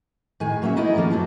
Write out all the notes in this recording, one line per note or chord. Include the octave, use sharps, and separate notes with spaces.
A2 D#3 G#4 G#5
F#3 A#3 C#4 F#4 E5
A3 B3 D#4 E4 G#4 D#5
D#3 F3 A3 A#3 C#4
F3 F#3 B3 A4